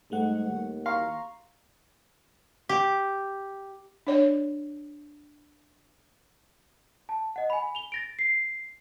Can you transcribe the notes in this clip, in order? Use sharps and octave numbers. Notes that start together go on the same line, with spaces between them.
G#2 G3 A3 F#5
D#2
F5 A#5 C6 C#6
G4
D4 C#5 D5
A5
D#5 F#5
G#5 B5
F7 G7
A6 A#6 D7
C7